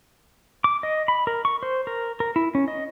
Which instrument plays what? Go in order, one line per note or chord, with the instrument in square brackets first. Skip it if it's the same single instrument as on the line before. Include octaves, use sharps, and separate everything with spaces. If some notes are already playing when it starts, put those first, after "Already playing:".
[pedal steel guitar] D6
D#5
B5
A#4
C#6
C5
A#4
A#4
E4
C#4
D#5